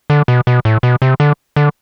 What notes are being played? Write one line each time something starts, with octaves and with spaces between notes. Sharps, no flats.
D3
B2
B2
A2
B2
C3
D3
D3